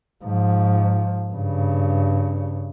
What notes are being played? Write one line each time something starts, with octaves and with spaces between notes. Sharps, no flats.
G#2 F3
G2 C#3